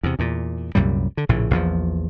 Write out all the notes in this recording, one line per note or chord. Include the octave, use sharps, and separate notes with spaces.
E2 C3
E2 A#2
C2 F#2 A#2 G3
D3
A#1 A2 C#3
A#1 E2 F3